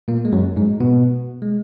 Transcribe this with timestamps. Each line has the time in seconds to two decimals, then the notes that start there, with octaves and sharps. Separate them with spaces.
0.08 A#2 A#3
0.25 G#3
0.32 F#2 F#3
0.56 G#2 G#3
0.80 B2 B3
1.42 G#3